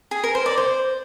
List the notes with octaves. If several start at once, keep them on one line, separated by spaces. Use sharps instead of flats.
G#4
A#4
C5
D5
C5